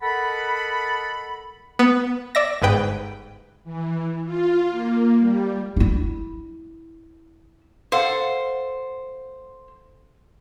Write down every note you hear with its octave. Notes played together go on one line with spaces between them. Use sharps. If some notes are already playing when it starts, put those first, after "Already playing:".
A4 A#4 D#5 F#5 A5 B5
B3
D5 E5 A#6
G1 G#2 B4 G5
E3
F4
A#3
G3
D#4 E4
A4 C5 F5 F#5